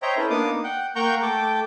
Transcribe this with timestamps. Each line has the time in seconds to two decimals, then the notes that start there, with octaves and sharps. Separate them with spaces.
0.02 C5 C#5 D#5 E5 G5 A#5
0.17 C#4 E4 A4 B4
0.30 A#3 B3 D4 D#4 D6 D#6
0.64 F#5 G5
0.96 A#3 F#5 G5 A#5 C#6 G6
1.22 A3 A4 G5 D6